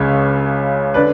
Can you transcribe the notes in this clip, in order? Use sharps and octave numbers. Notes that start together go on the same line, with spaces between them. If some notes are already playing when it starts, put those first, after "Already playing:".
Already playing: C#2 C#3 G#3 C#5
D3 B4 D5